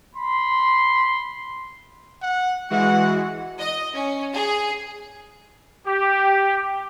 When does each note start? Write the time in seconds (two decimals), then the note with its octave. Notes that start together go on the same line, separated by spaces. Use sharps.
0.16 B5 C6
2.22 F#5
2.70 E3 G#3 F#4 F#5
3.60 D#5
3.94 C#4
4.33 G#4
5.87 G4